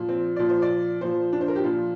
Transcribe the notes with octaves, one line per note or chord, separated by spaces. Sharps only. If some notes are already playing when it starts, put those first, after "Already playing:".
Already playing: A#2 F3
C4
A#2 F3 D5
C5
D5
A#2 F3 C5
D4
C5
A#4
G4
A#2 F3 F4